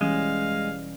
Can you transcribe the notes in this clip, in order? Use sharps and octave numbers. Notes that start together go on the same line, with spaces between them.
E1 E3 G3 G#3 C#4 F5